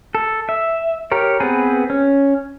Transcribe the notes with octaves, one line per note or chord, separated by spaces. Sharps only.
A4
E5
G4 A#4 C#5
B3 C4 G#4 B4
C#4